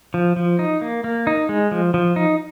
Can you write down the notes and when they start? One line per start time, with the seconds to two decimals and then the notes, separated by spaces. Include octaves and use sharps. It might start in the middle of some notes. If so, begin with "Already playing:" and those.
0.14 F3
0.36 F3
0.59 D#4
0.82 A#3
1.04 A#3
1.27 D#4
1.49 G#3
1.71 F3
1.94 F3
2.16 D#4